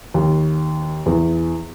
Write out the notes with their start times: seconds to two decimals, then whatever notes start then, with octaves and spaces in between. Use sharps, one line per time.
0.14 D#2
1.06 E2